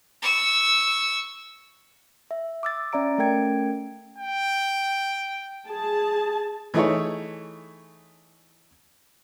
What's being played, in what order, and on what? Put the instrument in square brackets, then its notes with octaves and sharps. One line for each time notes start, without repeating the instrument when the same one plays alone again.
[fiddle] C#6 E6
[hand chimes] E5
D6 E6 A6
C#4 D5 E5 A#5 D7
A3 C#4 A#4 G5 G#6 D7
[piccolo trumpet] G5
[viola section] G#4 A5
[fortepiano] E3 A3 D#4 E4 G#4 C#5